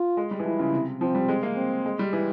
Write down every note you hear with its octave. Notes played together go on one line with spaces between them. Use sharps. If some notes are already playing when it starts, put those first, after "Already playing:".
Already playing: F4
G#3
G3
E3
F3 E4
C#3
C3
F3 C4
G3
G#3
A#3
C4
G#3
G3
E3